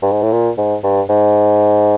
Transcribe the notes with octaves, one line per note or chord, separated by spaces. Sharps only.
G2
G#2
A2
A#2
G#2
G2
G#2